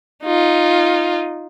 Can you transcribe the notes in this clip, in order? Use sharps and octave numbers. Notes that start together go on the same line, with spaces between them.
D#4 F4